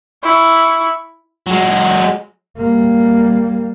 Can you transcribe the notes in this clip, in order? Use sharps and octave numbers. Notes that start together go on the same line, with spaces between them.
E4 C#6
F#3 G#3
G3 A#3